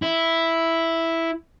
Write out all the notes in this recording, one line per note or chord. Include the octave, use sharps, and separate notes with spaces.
E4